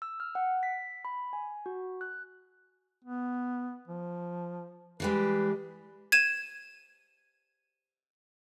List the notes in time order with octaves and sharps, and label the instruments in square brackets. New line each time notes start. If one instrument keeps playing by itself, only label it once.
[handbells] E6
F6
F#5
B6
B5
G#5
F#4
F#6
[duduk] B3
F3
[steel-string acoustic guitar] E3 G3 G#3 [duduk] B4
[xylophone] G#6 D#7 E7